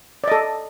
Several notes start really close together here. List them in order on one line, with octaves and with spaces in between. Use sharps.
D5 D#5 A4